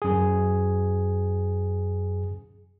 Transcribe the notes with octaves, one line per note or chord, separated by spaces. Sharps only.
F#2 G#4